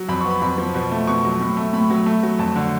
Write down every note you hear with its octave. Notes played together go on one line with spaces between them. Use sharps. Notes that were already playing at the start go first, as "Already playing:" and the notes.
Already playing: F#3
F2 B5
B3 C#6
B5
F2 B5
F3
B2
A3
B2 C#6
F#3
A2
A3
A2 B5
F#3
A3
F#3
F2 A5
D3